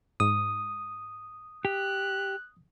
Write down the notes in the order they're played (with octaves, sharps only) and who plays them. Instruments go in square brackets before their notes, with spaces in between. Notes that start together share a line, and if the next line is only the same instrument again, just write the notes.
[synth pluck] G#2 [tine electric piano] D#6
[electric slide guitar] G4 [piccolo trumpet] F#6